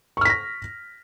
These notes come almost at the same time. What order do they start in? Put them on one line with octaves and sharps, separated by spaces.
C#6 F6 B6 A#6